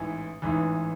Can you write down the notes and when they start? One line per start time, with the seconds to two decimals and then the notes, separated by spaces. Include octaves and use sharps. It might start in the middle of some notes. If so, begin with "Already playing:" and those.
Already playing: A1 G#2 E3
0.42 A1 G#2 E3